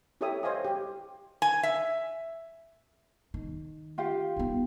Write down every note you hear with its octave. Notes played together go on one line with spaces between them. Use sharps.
E4 G4 A4 C#5 E5 D#6
C5 C#5 D#5 F5 G#5 D#6
G4
G#5
E5
D#3
F4 G4 F5
B3 D#4